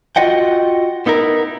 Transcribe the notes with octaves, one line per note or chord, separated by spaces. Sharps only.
F4 F#4 D#5 F#5 G5
B3 D#4 E4 A#4